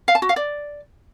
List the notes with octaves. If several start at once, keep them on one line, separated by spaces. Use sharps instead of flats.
F5
A5
F#4
F5
D5